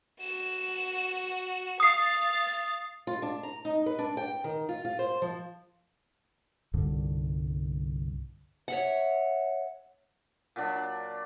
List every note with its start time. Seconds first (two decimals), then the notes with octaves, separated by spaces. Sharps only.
0.20 F#4 E7
1.80 F5 D#6 A6 C7
3.07 F4
3.22 D4
3.43 A#5
3.65 D#4
3.86 B4
3.99 D4
4.17 G5
4.44 D#3
4.69 F4
4.85 F4
4.99 C5
5.22 F3
6.73 C2 G2 D3
8.68 C#5 E5 F#5
10.56 A#2 F#3 D4